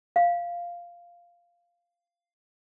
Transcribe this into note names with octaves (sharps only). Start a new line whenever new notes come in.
F5